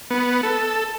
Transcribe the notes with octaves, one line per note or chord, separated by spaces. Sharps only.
B3
A4